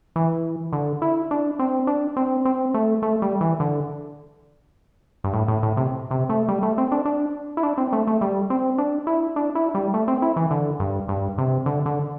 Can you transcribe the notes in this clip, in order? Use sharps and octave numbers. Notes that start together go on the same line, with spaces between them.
E3
D3
E4
D4
C4
D4
C4
C4
A3
A3
G3
E3
D3
G2
A2
A2
A2
C3
C3
A3
G3
A3
C4
D4
D4
E4
D4
C4
A3
A3
G3
C4
D4
E4
D4
E4
G3
A3
C4
E4
E3
D3
G2
G2
C3
D3
D3